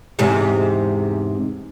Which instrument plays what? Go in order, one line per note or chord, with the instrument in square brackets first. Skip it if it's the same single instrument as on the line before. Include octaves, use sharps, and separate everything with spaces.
[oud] E2 G#2 C3